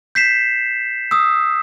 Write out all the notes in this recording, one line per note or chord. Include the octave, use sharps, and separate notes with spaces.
G6 B6 C7 E7
D#6 E6